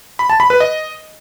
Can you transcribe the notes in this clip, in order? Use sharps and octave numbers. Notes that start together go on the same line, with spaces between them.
B5
A5
B5
B4
D#5